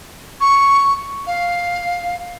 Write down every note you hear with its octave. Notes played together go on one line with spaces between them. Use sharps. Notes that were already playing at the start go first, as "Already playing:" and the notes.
C#6
F5